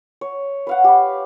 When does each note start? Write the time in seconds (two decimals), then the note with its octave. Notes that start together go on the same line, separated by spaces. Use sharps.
0.21 C#5
0.67 B4 F5 F#5
0.84 G4 B5